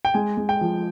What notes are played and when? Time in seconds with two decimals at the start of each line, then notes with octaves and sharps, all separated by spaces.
0.05 G5
0.14 G#3 G#5
0.37 G#3
0.49 G5
0.61 F3